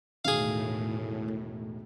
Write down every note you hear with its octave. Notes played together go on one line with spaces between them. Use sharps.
E1 A2 D#3 G#4 F5